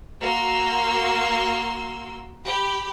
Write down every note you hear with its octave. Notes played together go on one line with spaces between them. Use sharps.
A#3 F#4 C6 E6
G4 B5